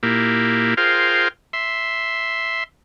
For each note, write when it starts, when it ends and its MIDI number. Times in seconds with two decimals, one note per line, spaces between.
0.03 0.74 46
0.03 0.74 58
0.03 0.74 64
0.03 0.74 67
0.77 1.28 65
0.77 1.28 68
0.77 1.28 70
0.77 1.28 72
0.77 1.28 77
0.77 1.28 79
1.53 2.64 76
1.53 2.64 84